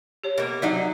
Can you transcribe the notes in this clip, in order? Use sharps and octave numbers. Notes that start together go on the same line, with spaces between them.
G4 C#5
B2 A#3
C3 F#3 D#4 D5